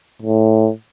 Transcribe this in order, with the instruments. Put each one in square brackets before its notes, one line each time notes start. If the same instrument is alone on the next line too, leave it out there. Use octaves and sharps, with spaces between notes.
[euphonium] A2